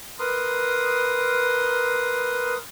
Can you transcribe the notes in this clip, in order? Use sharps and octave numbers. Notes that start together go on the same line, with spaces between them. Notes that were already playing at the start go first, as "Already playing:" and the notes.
A#4 B4 C6 D#6